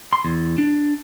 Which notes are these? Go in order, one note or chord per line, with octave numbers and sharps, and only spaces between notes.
C6
E2
D4